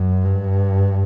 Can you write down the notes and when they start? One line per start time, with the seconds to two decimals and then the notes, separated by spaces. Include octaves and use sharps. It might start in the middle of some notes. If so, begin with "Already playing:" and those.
Already playing: F#2
0.24 G2